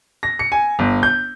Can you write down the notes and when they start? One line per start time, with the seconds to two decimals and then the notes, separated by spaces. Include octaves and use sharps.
0.23 A#6
0.39 C#7
0.52 G#5
0.79 G1
1.03 G6